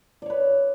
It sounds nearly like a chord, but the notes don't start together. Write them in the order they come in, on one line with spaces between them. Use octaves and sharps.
D5 C#5 B4